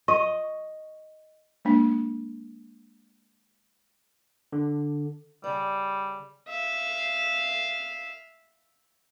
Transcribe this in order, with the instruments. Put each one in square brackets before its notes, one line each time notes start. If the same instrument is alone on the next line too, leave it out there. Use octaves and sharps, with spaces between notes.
[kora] D#5 [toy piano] C#6
[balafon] G#3 A#3 D4
[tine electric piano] D3
[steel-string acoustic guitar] C#3 D5 [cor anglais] G3
[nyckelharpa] E5 F5